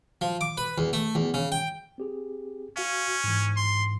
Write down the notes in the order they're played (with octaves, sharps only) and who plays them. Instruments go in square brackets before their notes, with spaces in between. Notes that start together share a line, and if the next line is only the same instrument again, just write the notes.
[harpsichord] F3
D6
B4
E2
A3
E2
C#3
G5
[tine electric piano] C4 G4 G#4
[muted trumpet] C#4 [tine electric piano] F#4 F5
[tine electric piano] G#2 E3
[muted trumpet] C6